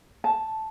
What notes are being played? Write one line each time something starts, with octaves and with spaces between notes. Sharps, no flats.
A5